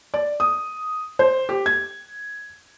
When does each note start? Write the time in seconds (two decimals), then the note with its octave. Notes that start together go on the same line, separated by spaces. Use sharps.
0.14 D5
0.40 D#6
1.19 C5
1.49 G4
1.66 G#6